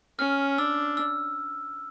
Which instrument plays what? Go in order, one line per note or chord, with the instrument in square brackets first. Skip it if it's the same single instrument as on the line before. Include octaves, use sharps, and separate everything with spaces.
[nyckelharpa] C#4 [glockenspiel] F6
[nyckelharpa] D4 [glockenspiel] E6
[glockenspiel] E6